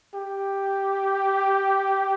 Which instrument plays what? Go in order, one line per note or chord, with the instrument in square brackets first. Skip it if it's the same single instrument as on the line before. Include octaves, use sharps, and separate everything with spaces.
[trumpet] G4